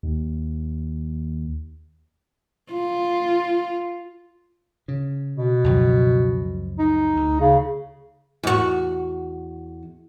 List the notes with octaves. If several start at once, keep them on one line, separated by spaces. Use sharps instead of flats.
D#2
F4
C#3
B2
C#2 F#2 F3
D#4
D2
C#3
E2 F#4